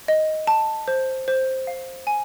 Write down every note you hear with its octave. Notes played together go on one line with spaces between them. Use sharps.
D#5
A5
C5
C5
F5
G#5